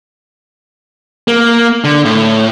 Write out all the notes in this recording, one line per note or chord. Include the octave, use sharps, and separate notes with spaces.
A#3
D3
A2